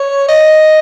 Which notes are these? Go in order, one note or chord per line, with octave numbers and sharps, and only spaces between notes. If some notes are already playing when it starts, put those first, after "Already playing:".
Already playing: C#5
D#5